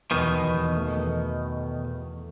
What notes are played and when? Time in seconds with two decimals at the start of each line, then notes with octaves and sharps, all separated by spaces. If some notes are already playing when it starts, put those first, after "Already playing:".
0.11 E2 B2 D#3
0.32 E2
0.54 E2
0.76 A3
0.97 E2